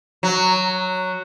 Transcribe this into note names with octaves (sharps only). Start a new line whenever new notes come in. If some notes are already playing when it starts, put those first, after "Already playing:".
F#3